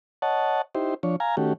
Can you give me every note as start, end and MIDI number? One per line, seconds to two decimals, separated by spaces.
0.22 0.62 73
0.22 0.62 75
0.22 0.62 78
0.22 0.62 81
0.75 0.94 63
0.75 0.94 64
0.75 0.94 67
0.75 0.94 72
1.03 1.16 53
1.03 1.16 62
1.03 1.16 73
1.20 1.36 77
1.20 1.36 80
1.20 1.36 82
1.37 1.53 51
1.37 1.53 57
1.37 1.53 61
1.37 1.53 66
1.37 1.53 67